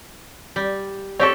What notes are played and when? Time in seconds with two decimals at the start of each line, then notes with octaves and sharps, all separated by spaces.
0.56 G3
1.20 C4 G4 A4 C#5 C#6